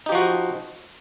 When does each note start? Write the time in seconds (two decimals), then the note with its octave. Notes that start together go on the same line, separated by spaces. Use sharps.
0.06 D#4
0.09 G4
0.12 F3
0.15 F#4